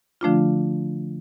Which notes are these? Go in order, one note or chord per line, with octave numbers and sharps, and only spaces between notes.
D3 F3 A3 D4 F4